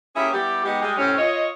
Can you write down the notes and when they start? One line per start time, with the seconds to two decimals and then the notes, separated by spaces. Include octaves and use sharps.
0.16 A#3 C#4 G4 G#4 C#5 E5
0.33 G3 B3 E4 G4
0.63 G#3 B3 D#4 G4
0.81 G3 G#3 G4
0.98 A2 C3 C4 C#4
1.18 F4 C#5 D#5